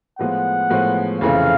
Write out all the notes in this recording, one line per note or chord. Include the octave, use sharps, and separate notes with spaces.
A2 F3 G#3 B3 F#5
A2 F3 G#3 B3
F1 F2 C#3 E3 A3 F5